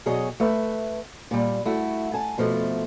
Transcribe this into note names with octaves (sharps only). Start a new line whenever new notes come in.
B2 F#3 G#4 C#5 D#5
A3 B4 E5
A#2 G3
A3 E4 F#4
G#5 A5
F2 B2 F3 A3